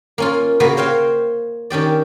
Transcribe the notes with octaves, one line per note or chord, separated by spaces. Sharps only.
A#3 C#4 F4
C#3 A#3 F#4 B4 B5
C5 C#5 F5 G5
D#3 C#4 G4 D5